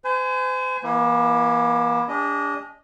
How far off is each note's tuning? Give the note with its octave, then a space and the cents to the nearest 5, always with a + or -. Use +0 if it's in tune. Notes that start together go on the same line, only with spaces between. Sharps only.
C5 -40 G#5 +0
E3 +0 A#3 +40 E4 +0
D4 -30 G#4 -45 D#5 +0